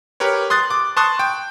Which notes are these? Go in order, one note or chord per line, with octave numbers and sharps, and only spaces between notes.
G4 A#4 B4 C#5
C6 D#6 F#6 A6
D6
A5 C6 C#6 D#6 F#6
G5